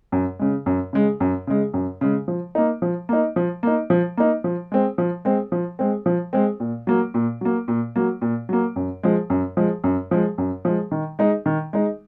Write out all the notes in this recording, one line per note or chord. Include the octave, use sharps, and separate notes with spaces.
F#2
C#3 G#3
F#2
C#3 G#3
F#2
C#3 G#3
F#2
C#3 G#3
F3
A#3 D#4
F3
A#3 D#4
F3
A#3 D#4
F3
A#3 D#4
F3
G#3 C4
F3
G#3 C4
F3
G#3 C4
F3
G#3 C4
A#2
F#3 A#3
A#2
F#3 A#3
A#2
F#3 A#3
A#2
F#3 A#3
F#2
F3 G#3
F#2
F3 G#3
F#2
F3 G#3
F#2
F3 G#3
D#3
G#3 D#4
D#3
G#3 D#4